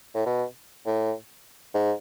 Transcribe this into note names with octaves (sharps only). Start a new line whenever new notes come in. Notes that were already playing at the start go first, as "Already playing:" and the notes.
A2
B2
A2
G#2